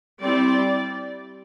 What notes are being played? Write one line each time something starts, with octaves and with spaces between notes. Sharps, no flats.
G3 C4 E4 D5